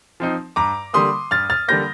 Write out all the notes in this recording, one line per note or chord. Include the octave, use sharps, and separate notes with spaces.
F3 C4 D#4
G2 A#5 D6
D3 G3 A#3 C6 D#6
G2 F6 A6
F6 A6
D3 G3 A#3 G6 A#6